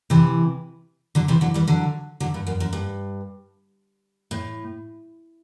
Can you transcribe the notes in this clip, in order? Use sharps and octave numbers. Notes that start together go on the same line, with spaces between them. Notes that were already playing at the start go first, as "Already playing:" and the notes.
C3 E3
D3 F#3
C3 E3
D3 F#3
E3 G3
D3 F#3
D3 F#3
G2
F#2
F#2
G2
A2